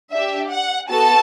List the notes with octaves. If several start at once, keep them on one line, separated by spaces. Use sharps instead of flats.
D4 G4 E5
F#5
B3 F#4 A4 A5